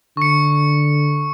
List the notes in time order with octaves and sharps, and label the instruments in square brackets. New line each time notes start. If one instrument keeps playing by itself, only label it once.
[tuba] D3 [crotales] C#6 C#7